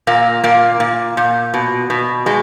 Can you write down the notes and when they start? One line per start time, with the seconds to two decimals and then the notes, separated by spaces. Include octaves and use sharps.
0.07 A#2 A#3
0.44 A#2 A#3
0.80 A#2
1.17 A#2
1.54 B2
1.90 B2
2.26 B2 G#3